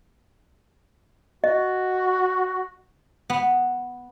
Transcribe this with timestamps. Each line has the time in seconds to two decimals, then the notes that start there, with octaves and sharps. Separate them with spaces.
1.44 F#4 D#5
3.30 B3